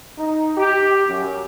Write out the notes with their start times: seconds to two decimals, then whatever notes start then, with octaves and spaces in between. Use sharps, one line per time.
0.18 D#4
0.57 G4
1.07 F#2